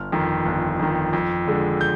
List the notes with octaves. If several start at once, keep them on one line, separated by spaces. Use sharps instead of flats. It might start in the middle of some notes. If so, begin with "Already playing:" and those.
Already playing: G1 F6
F2 D#3
G1
F2 D#3
F2
D3 G#3
G6